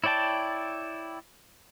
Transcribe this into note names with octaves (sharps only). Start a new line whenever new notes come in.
E4 C#5 D5 G5 A5